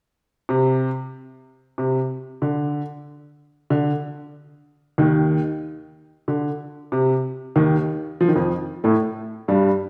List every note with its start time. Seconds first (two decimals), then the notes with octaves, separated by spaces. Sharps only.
0.49 C3
1.78 C3
2.42 D3
3.70 D3
4.98 D#2 D#3
6.28 D3
6.92 C3
7.56 D#2 D#3
8.21 F3
8.28 D#3
8.36 F2 F3
8.84 A2 A3
9.48 G2 G3